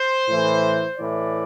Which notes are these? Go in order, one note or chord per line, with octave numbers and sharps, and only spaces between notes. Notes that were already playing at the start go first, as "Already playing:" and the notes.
Already playing: C5
A2 E3
A2 E3 D5